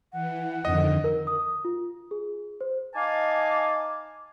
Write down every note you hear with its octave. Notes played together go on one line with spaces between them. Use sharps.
E3 F#5
F2 D3 D#3 D#5
A#4
D#6
F4
G#4
C5
D#4 D#5 F5 G#5 A5 D6